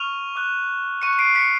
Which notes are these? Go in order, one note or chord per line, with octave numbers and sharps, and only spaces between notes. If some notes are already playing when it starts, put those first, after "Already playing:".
Already playing: C#6 F6 D#7 F7
D6 F#6
C#6 C#7 D#7
F#6
D#7
C7 D7
B6 C#7